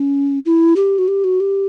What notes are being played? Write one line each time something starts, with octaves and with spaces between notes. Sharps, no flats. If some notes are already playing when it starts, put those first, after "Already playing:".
Already playing: C#4
E4
G4
F#4
G4
F#4
G4